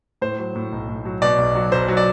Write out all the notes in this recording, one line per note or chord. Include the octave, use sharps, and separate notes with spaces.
A2 C5
F#3
A2
B1
A2
F#3
B2 D5
B1
F#3
B1 C5
F#3
D5